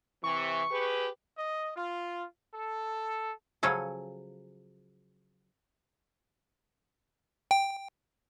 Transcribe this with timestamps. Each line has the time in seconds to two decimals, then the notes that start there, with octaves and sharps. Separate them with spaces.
0.24 C3 E3 C#6
0.71 G4 G#4 B4
1.38 D#5
1.76 F4
2.54 A4
3.63 C#3 F3 F#3 C#4 A4
7.51 G5